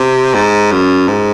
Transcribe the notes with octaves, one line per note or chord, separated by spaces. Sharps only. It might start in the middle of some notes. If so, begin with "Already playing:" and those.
Already playing: C3
G#2
F#2
G#2